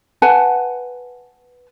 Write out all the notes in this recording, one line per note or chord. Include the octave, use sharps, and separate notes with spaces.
B4 F#5 G#5 A5